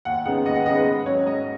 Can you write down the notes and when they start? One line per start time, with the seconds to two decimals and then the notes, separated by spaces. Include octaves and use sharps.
0.05 D#2 F#5
0.25 C#3 G#3 B3 D#4 F#5
0.45 D#2 D#5
0.55 F#5
0.66 C#3 G#3 B3 D#4 D#5
0.76 B4
0.86 G#2
1.06 F#3 C#4 C#5
1.26 G#2 D#5